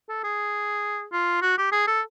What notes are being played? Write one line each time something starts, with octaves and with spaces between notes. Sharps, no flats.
A4
G#4
F4
F#4
G4
G#4
A4